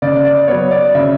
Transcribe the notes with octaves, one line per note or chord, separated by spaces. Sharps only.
C#3 D5
D5
F#3 B3 C#5
D5
C#3 E5